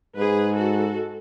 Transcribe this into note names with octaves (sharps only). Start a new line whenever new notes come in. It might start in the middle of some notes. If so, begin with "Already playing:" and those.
G#2 G#4 B4
F#4 A4